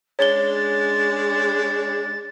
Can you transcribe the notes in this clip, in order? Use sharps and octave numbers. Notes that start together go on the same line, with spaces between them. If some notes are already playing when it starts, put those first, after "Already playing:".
G#3 C#4 D4 C#5 A6 G7